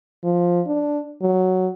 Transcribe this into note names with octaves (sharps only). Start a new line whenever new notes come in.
F3
D4
F#3